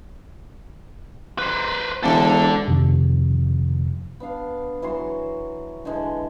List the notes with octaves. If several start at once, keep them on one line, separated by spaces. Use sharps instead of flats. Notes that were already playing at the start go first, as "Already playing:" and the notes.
B4 C5
E1 D4 A4
F2 C3 D#3 F3
B3 D4 F5
E3 F#3 C#5 C6
D3 E3 G#3